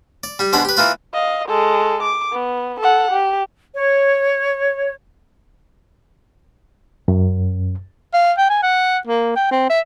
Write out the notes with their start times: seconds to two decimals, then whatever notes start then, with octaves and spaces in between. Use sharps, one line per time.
0.24 D5
0.39 G3 G4
0.53 B2 G#3 D4 C5 B5
0.65 G4 B4
0.77 E3 A#3 F4 B4
1.13 D#5 F5
1.48 G#3 A4
2.02 D6
2.32 B3
2.80 A4 F#5
3.11 G4
3.75 C#5
7.08 F#2
8.14 F5
8.38 G5
8.50 G#5
8.63 F#5
9.07 A#3
9.36 G5
9.51 C4
9.70 E5